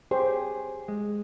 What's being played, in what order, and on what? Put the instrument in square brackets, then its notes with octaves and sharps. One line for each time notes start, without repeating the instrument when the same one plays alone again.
[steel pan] G4 C5 C#5 [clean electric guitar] G#4
[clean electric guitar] G#3